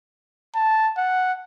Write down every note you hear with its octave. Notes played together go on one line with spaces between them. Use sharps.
A5
F#5